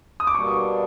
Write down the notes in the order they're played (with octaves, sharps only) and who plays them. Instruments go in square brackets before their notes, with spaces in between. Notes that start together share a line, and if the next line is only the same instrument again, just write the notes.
[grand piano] D#6
D6
[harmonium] B2 G3 A#3 D4 [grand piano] C#6